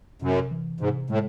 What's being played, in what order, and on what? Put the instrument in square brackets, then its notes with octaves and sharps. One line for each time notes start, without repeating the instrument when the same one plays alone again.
[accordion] F#2 [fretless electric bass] C3
[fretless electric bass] E3
[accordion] G#2 [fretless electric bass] C3
[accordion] A2 [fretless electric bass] G#3